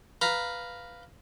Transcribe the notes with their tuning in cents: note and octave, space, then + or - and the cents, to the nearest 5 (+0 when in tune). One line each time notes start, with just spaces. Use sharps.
B4 +0 F5 +0 A#5 +0